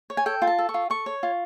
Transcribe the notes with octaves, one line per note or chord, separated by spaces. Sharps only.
C#5
G#5
A4 G5
F4
A5
A4
C#6
F4
A4 C#6
C#5
F4